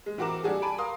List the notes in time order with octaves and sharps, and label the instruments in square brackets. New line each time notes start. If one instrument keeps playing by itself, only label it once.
[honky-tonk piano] G#3
E3 C4 F#4 A#4 D6 E7
G3 D4 F#4 G#4 A4
G#5 A5 B5 D7
A#4 F5 C6 D#6